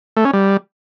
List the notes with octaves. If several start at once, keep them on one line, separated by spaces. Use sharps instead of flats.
A3
C#4
G3